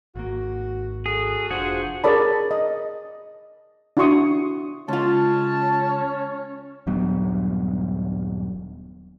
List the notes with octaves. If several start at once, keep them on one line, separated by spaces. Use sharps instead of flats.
G#1 A#3 F#4
F#4 G#4 A4
F1 D4 F4 F#4 G#4 C5
G#4 A#4 C#5 D5 A5 B5
D#5
D4 E4 F#4 C6 C#6 D#6
C#2 C#4 F4 A5
D#1 G2 F#3 B3